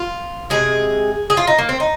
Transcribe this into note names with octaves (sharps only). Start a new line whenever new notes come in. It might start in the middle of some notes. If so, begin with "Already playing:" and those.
Already playing: F4
C3 D#3 G#3 G#4
G#4
F4
D#4
A#3
C4
D#4